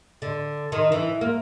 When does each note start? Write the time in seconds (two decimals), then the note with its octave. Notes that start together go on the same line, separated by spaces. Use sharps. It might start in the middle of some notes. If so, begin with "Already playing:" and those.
0.22 D3
0.72 D#3
0.92 E3
1.21 A#3